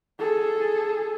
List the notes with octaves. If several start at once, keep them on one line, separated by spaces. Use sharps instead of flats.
G#4 A4